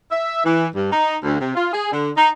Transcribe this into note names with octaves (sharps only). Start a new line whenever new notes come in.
E5
E3
G2
D#4
D2
C3
F4
G#4
D3
D#4